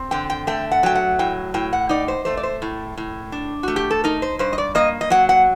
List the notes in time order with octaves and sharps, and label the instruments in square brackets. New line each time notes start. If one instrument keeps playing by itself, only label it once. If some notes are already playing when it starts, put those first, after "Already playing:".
Already playing: [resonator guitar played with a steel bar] C4
D3 G5
G5
A3 G5
F#5
F#3 G5
F#5
A2 G5
A2 G5
F#5
D#4 D5
C5
A3 C5
D5
C5
A2
A2
D4
A3 F#4
G4
A4
D#4 A#4
C5
G2 C5
D#5
D5
A#3 D#5
D#5
F#3 F#5
F#5